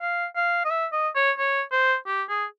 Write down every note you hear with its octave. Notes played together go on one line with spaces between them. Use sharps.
F5
F5
D#5
E5
D#5
C#5
C#5
C5
G4
G#4